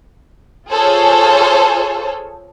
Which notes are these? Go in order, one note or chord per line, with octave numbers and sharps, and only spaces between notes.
F4 G#4 A4 C5 C#5